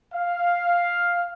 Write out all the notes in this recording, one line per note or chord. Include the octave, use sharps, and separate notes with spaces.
F5